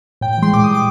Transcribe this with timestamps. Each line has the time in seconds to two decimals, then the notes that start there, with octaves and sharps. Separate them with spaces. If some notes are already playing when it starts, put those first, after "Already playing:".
0.21 A2 G5
0.33 G5
0.38 E3 G#3 C6
0.53 A#2 D6
0.64 G3 D#6
0.74 D6